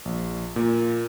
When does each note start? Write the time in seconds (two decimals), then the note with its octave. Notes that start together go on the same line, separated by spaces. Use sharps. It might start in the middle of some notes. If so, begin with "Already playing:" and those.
0.05 A#1
0.56 A#2